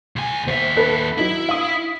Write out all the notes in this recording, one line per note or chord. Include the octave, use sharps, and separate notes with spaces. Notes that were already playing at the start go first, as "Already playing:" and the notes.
C#2 G#5
D#2 C5 E5
A4 B4
F#3 D#4 E4
F5 D#6